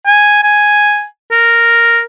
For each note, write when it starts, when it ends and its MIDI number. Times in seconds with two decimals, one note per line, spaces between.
0.07 0.39 80
0.44 1.05 80
1.32 2.01 70